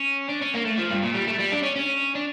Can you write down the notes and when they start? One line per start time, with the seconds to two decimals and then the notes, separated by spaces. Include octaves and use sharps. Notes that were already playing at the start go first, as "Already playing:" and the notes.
Already playing: C#4
0.29 D4
0.42 C#4
0.54 A#3
0.65 A3
0.78 F3
0.90 G2
1.03 A#2
1.14 G3
1.27 A3
1.39 G3
1.52 D4
1.63 C#4
1.76 C#4
2.15 D4